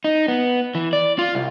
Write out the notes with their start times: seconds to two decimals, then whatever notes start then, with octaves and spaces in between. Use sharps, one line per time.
0.04 D#4
0.28 B3
0.75 E3
0.93 D5
1.19 F4
1.35 C2